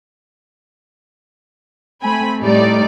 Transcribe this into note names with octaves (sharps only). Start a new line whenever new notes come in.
A3 C4 G#5 B5
A2 G3 A3 D#4 D5